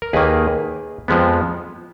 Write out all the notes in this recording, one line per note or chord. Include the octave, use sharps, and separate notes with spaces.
A#4
D#2 D#3 A#3 G#4 B4
F2 F3 G#3 B3